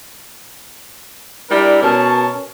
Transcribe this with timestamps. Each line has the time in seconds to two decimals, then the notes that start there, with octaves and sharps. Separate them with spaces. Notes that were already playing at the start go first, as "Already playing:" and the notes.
1.50 G3 D4 E4 A#4
1.82 B2 C#4 A#4 C#5 A5